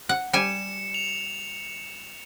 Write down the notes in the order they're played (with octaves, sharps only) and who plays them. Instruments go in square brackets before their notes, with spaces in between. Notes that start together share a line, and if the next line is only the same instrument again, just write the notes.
[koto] F#5
[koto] G3 G#5 [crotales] C#7 E7
[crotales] F7